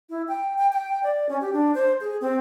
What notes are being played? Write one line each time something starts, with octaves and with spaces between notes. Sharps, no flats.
E4
G5
G5
G5
D5
C#4
G4
D4
C5
G#4
C4